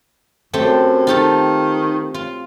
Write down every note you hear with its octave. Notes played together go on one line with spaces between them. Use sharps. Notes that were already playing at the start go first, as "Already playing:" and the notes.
F#2 A3 C4 G4
D#3 F4 G4 A4
F4